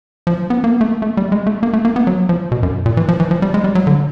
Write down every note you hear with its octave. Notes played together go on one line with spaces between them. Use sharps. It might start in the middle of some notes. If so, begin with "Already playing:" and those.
F3
B3
A#3
B3
A3
A#3
A3
G3
G#3
A3
A#3
A3
A#3
B3
F#3
F3
B2
F#2
A#2
E3
F3
E3
F3
G3
G#3
G3
F#3
D3